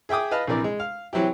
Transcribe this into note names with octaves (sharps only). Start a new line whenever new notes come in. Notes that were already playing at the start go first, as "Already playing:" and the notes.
G#4 E5 G5 D6 D#6
B4 D#5 F5 A5
A#1 C3 E3 A#4 D5
G#3
F5
E3 F#3 C4 E4 G4